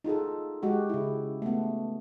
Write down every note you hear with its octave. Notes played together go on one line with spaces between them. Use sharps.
D#4 F4 G#4 A4
G#3 F#4 G4
C#3 E4
A3 B3